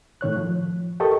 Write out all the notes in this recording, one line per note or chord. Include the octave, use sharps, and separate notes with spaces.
A2 D#3 C#5 F#6
F3
G4 A4 A#4 D#5 C#6